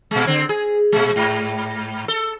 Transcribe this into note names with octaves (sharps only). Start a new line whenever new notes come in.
A#2 G#3
D3 C4
G#4
A#2 G#3
G#2
A4